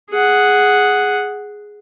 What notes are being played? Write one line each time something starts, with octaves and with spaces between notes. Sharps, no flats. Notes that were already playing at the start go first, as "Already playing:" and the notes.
G#4 F#5